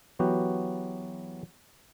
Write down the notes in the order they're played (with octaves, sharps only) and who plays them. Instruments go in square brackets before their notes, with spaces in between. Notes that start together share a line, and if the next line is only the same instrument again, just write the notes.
[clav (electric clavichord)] E3 F#3 B3 F#4 G4